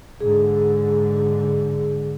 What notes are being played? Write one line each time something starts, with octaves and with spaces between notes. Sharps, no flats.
G#2 D3 G#4